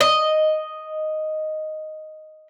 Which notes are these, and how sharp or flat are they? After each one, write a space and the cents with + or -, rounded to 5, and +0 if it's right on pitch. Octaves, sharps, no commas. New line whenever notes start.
D#5 +0